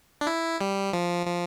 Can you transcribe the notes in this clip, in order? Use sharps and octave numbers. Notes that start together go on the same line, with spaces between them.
D4
E4
G3
F3
F3